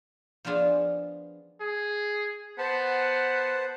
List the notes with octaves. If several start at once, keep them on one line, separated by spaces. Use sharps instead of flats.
F3 B3 D4 F4 G#4
G#4
B3 C5 F#5 A5